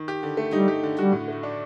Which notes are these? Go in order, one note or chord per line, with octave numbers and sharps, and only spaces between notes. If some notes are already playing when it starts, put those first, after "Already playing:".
Already playing: D#3
G4
D3
A3
G3 D#4
G4
D3
G3 F#4
A2
A3
D4